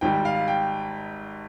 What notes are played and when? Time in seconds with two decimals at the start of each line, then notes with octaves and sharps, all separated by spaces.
0.01 G#1 G#2 G3 G5
0.25 F5
0.48 G5